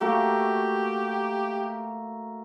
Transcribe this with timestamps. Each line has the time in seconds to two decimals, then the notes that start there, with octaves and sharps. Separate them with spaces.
0.01 A3 A#3 F#4 G4